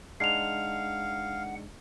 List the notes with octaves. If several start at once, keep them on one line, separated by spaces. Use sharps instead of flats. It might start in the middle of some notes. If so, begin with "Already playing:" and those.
G#3 D4 D#4 F5 F#5 C7 F7